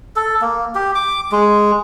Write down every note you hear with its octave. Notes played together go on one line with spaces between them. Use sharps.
A4
A#3
G4
D6
G#3